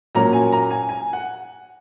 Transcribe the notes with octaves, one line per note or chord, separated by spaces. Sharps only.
A#2 F#3 A#3 C#4 A#5
G#5
A#5
G#5
G#5
F#5